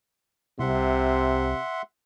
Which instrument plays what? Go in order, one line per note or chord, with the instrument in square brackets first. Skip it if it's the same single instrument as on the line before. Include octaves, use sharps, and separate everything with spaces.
[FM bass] C2 [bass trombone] C3 [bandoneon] E5 F#5 C6